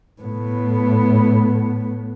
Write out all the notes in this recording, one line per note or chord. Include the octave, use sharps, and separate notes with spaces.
A2 B3